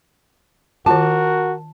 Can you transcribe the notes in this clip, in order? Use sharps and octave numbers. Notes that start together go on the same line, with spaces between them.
D#3 F4 F#4 A#4 A5